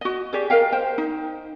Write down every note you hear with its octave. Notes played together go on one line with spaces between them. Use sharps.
F#4 D#5
G4 G#4 D5
A#4 D#5 F5 G5
C5 G5
D#4